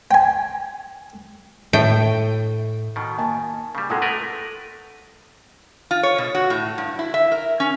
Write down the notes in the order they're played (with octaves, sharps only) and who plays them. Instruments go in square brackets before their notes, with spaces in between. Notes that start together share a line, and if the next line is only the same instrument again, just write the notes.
[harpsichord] G5 G#5
[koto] A2 G5
[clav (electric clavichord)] B2 D#3
[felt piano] A#3 G#5 A5
[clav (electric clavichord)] C#3 G3
[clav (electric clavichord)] C3 G#3 [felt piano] A4 F#5 D#6
[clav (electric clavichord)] A3 A#4 B4
[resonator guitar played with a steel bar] F4
C#5
B2
F#4
A2
G2
E4
E5
A#4
C#4